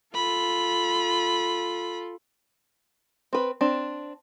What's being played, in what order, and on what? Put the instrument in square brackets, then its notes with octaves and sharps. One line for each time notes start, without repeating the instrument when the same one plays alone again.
[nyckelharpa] F4 A4 [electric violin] B5
[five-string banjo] C4 B4
C4 D4